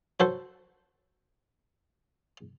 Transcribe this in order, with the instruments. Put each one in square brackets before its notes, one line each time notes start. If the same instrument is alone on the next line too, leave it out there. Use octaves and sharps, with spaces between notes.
[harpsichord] F#3 F#4 A4 C5